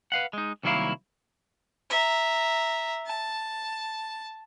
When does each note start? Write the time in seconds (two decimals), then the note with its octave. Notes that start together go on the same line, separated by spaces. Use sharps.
0.12 B4 F5 F#5
0.33 G#3 D#4
0.63 C2 D#3 F#3 A#3 E4 F5
1.90 E5 A#5
3.06 A5